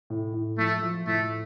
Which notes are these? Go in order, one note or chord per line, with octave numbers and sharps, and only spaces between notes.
A2
A2
F3 A3
F3
A2 A3